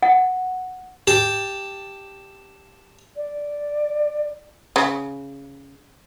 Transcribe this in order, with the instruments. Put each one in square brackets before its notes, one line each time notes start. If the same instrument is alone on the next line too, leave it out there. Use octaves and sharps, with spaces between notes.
[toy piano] F#5
[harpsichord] G4 A5
[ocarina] D5
[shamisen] C#3